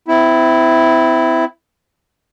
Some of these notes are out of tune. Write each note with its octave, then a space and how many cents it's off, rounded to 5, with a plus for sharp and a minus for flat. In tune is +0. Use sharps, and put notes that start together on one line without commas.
C4 -35 E4 +0